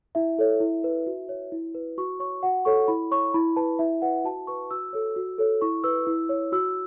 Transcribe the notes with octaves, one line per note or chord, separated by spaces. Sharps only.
E4 E5
A4 C#5
E4
B4
F#4
C#5
E4
B4
F#4 C#6
C#5 C#6
F#4 F#5
A4 C#5 C#6
E4 B5
C#5 C#6
E4 B5
B4 A5
E4 E5
B4 F#5
F#4 A5
B4 C#6
F#4 E6
A4 C#5
F#4
A4 C#5
E4 C#6
B4 E6
E4
C#5
F#4 E6